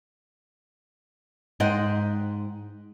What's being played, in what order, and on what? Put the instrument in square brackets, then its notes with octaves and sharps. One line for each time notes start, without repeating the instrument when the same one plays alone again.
[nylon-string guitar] G#2 C5 D#5 F#5 G5